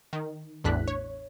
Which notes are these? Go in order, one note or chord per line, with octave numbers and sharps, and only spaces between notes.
D#3
A1 E2 A2 D4 F#6 B6
C#5